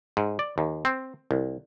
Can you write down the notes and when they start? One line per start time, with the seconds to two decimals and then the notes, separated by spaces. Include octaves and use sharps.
0.17 G#2
0.39 D5
0.58 D#2
0.85 C4
1.31 C2